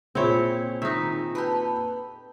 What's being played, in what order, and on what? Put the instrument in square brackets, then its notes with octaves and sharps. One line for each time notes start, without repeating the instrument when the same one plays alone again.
[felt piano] A#2 G#4 [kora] C4 E4 C#5
[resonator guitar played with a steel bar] D#3 [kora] D#4 E5
[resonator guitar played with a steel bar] G4 A4 B4